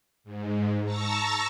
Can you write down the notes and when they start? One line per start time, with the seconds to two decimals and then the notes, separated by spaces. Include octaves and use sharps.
0.24 G#2
0.85 A5 A#5 C#6 E6 A6 A#6